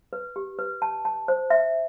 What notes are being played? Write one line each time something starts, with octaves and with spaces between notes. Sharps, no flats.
B4
G4
B4
A5
A5
C5
E5